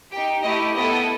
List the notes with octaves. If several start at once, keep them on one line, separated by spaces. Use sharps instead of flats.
D#4 G4 G5
A3 E4 G4 D#5
B3 E4 A4 D#5